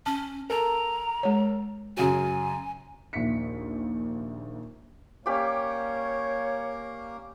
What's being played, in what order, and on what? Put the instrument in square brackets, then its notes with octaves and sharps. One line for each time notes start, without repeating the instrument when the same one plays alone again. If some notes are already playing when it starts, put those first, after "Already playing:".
[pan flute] C#4 [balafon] A5
[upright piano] A4 A#4 [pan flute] A#5
[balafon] G#3 C#5
[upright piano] F#2 C#3 F#3 [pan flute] G#5
[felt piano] A#1 D#2 E5 B6 C#7
[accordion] A#3 [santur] C#4 G4 D5 [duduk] C#5